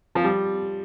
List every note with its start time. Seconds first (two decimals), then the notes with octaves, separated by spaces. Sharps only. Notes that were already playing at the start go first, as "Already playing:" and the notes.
0.15 F3
0.24 G3